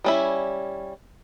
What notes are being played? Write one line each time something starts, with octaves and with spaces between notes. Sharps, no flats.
G3 C#4 E4